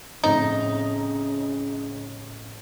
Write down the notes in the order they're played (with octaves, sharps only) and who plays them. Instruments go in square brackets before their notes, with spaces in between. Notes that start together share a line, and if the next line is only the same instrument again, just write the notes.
[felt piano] F2 A2 C4 [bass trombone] C#3 [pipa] D#4